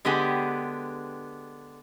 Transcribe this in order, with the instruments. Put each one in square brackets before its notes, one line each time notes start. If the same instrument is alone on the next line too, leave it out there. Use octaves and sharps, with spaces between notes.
[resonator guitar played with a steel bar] D3 G#3 B3 G4 G#5